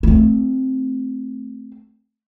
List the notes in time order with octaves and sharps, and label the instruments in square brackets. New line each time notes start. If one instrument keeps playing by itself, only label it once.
[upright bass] A3 C4